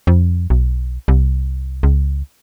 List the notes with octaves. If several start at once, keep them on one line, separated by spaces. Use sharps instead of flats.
F2
B1
C2
C#2